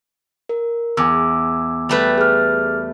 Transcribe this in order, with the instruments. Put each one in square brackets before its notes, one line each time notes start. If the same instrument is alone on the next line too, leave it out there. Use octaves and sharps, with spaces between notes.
[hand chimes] A#4
[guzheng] E2 [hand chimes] G#5 D6 E6
[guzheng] G3 A3 B4
[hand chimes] G#4 F6